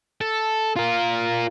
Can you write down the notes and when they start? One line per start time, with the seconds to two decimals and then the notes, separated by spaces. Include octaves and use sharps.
0.21 A4
0.76 F4 A#4